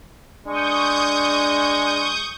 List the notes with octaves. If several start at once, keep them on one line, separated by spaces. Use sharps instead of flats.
G#3 D4 C#6 D#6 G6